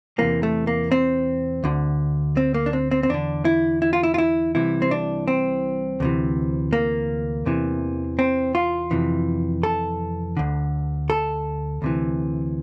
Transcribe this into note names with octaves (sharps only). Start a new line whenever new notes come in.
E2 C3 E3 A#3
A3
A#3
C4
D2 D3
C4
A#3
D4
C4
C4
C4
E2 D3 D4
E4
E4
F4
E4
F4
E4
C2 C3 E3 E4
C4
D4
C4
D2 C3 E3
A#3
E2 C3 E3
C4
F4
F2 C3 E3
A4
D2 D3
A4
D2 C3 E3